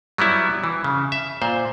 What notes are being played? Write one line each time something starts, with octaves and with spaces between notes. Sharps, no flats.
F#3 G3 B3 E4
E3
C#3
E5
A#2 C5